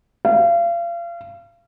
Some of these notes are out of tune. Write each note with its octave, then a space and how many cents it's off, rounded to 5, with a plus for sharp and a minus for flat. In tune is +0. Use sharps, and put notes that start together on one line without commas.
F5 -35